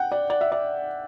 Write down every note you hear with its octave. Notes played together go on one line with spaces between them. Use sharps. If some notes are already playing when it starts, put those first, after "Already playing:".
Already playing: F#5 G5
D5
D5
E5
D5